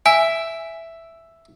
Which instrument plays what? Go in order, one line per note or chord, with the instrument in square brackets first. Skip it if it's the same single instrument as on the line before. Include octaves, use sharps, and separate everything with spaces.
[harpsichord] E5 [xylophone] G#5